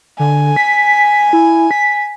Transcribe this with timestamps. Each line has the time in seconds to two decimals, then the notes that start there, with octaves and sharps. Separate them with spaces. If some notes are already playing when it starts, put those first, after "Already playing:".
0.19 D3 G#5
0.56 B6
1.33 E4
1.71 B6